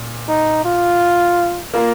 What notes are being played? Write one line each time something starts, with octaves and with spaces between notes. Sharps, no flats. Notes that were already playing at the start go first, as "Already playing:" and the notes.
Already playing: A#2
D#4
F4
A#3 F4 A#4